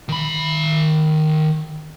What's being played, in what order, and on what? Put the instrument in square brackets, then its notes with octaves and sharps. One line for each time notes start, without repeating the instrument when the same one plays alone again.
[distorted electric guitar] D#3 B5